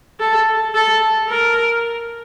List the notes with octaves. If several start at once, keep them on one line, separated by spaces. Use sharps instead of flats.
A4
A4
A#4